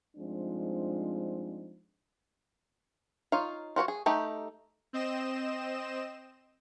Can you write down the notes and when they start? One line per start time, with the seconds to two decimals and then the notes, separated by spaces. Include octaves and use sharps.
0.16 G2 F3 G#3 C4 D4 D#4
3.32 D#4 F4 C#5 F5
3.76 F4 F#4 B4 C#5
3.88 G#4
4.06 A3 D#4 G4
4.93 C4 D#5 E7